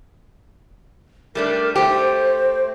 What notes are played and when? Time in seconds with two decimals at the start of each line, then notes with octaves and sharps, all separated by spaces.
1.35 G3 A3 D4 A#4
1.76 A3 G4 C5